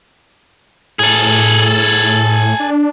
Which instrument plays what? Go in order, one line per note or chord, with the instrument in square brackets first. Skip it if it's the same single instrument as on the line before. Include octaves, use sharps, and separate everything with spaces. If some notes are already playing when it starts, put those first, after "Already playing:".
[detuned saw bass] A2 [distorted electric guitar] G#4 A4
[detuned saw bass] D4